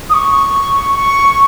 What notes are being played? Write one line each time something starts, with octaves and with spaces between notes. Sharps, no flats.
D#6
C#6
C#6